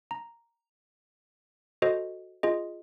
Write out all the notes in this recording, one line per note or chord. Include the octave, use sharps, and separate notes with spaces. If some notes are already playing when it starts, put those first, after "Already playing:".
A#5
F#4 A4 C5 D#5
F4 G#4 D#5